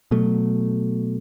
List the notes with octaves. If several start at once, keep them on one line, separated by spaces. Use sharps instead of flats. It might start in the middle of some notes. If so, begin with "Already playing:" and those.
B2 F#3 A3